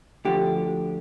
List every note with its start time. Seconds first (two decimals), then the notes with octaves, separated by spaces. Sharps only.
0.25 D2 D3 F3 G4